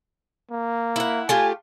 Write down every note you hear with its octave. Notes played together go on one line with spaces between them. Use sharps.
A#3
E4 F#5
A3 F4 G4 G#5